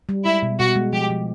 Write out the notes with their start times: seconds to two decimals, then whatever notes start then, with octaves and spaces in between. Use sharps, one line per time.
0.09 G3
0.25 G#3 E4
0.43 B2
0.59 B2 F#4
0.76 G#3
0.93 F3 G4
1.10 F3